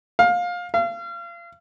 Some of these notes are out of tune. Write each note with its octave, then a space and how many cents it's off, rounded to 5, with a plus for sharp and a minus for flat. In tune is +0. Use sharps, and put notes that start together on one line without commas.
F5 +20
F5 -35